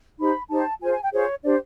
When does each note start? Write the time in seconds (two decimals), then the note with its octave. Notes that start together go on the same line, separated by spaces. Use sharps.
0.19 D#4 G4 C5 B5
0.50 D#4 G4 C5 A5
0.81 F4 G#4 C5 G#5
0.92 G#5
1.02 G5
1.12 F4 G#4 C5 C#5
1.43 D4 G4 C5 D5